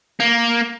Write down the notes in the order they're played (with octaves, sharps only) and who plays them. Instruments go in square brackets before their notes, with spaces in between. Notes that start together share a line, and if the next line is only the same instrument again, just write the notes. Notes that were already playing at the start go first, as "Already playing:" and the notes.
[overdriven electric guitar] A#3